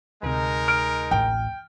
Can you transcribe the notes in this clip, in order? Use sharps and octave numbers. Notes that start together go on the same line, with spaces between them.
D2 C3 G#3 D#4 A#4
F6 D7
A1 G5